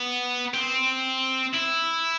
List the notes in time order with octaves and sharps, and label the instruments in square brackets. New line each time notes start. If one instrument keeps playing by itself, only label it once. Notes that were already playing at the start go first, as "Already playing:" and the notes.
Already playing: [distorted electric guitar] B3
C4
E4